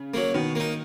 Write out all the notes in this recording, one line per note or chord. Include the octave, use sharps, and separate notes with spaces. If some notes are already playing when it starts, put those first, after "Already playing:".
Already playing: C#3
F#3 A#3
B2 D#3
A#3 D#4